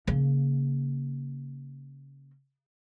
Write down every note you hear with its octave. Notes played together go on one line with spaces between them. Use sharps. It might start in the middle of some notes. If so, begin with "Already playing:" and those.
C#3 A#3